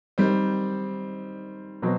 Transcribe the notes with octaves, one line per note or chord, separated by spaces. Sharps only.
D#3 G3 C4
B2 F#3 C4